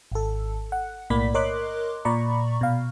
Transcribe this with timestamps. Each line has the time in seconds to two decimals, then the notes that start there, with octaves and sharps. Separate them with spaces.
0.12 G#1 A4
0.72 F#5
1.10 B1 A2 A#3 D5 B5 B6
1.34 A#4 C#5 D#5 C6 D6 F#6
2.05 A#2 D5 A#5 B5 C#6
2.61 B2 F5